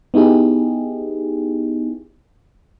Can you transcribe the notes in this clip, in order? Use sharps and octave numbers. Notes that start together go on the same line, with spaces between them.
B3 D#4 E4 G4 G#4